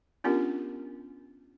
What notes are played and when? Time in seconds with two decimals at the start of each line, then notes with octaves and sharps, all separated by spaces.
0.24 B3 C#4 D4 F4 G4 A#4